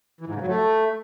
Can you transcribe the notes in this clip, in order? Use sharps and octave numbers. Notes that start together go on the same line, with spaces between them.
E3
G#2
C#3
F#3
A3